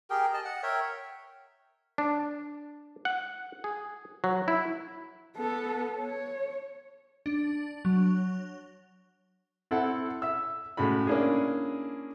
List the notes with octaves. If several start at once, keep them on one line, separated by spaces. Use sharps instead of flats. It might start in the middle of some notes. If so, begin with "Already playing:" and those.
G4 G#4 A#4 G5
D#5 A5
F#5
A#4 C#5 E5 G5
D4
F#5
G#4
F#3
E4
B3 A4
C#5
D4
F#3
C4 E4 A4 F#5
E5 E6
A2 C#3 G#3 F#4 B5
A#3 C#4 D4 E4 G#4